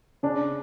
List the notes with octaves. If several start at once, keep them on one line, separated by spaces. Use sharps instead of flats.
C#3 D4